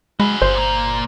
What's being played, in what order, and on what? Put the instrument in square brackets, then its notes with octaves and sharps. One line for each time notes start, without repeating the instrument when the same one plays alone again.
[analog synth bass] G#3 [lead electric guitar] F#4 G#4 [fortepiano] B5
[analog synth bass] G1 [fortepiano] C5
[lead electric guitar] A#2 A#3